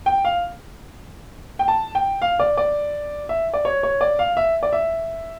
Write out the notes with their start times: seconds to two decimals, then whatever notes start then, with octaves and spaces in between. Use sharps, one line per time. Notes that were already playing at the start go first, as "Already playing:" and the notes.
0.06 G5
0.25 F5
1.59 G5
1.68 A5
1.95 G5
2.22 F5
2.40 D5
2.57 D5
3.29 E5
3.54 D5
3.65 C#5
3.83 C#5
4.01 D5
4.19 F5
4.37 E5
4.63 D5
4.73 E5